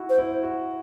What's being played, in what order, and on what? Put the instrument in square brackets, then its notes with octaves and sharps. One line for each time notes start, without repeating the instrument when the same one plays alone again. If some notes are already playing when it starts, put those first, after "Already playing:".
Already playing: [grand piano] E4 F#4
[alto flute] C5
[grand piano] E4
F#4